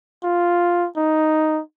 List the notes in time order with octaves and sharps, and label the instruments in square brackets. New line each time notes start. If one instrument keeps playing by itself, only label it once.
[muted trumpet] F4
D#4